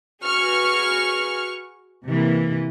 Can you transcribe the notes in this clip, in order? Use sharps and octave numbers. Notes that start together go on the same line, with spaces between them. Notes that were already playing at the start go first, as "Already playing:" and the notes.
F#4 G#4 B4 C#6 F6
C3 E3 A#3